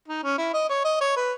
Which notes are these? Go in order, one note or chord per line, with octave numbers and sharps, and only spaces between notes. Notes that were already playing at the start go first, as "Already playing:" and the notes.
D#4
C#4
E4
D#5
C#5
D#5
C#5
B4